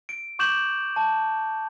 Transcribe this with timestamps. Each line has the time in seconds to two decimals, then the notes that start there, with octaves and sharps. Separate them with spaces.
0.09 D7
0.39 C#6 D6 G6 E7 F#7
0.96 A5